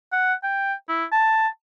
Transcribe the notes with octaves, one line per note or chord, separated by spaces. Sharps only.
F#5
G5
E4
A5